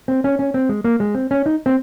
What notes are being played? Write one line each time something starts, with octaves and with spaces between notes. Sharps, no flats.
C4
C#4
C#4
C4
G#3
A#3
G#3
C4
C#4
D#4
C4